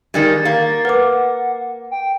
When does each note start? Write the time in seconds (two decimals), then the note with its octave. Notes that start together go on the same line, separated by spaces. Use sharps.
0.14 D#3 G3 G#3 A6
0.45 A#3
0.85 A#4 B4 F#5 D6
1.91 G5